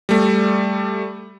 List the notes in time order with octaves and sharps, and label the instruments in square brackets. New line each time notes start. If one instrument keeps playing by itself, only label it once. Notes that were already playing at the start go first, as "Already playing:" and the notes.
[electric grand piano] G3 A3